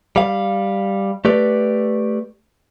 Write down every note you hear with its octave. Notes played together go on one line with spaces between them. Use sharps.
G3 F5
A3 G4 B4 D5